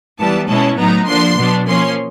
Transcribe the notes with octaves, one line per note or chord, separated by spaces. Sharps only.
E3 G3 B3 A5
B2 G#3 C#4 E4 A5
A2 F#3 B3 D#4 A#5
D3 F3 A#3 D4 C6
B2 F#3 B3 D4
F3 A#3 C#4 C6